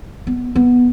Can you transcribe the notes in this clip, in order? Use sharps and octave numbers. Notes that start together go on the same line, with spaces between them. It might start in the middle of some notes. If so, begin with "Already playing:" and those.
B3
B3